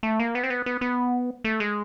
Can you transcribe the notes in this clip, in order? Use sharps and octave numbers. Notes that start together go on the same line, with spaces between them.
A3
A#3
B3
C4
B3
B3
B3
A3
G#3